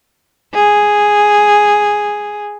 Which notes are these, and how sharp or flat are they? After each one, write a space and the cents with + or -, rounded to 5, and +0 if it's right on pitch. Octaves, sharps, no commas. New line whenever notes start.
G#4 +0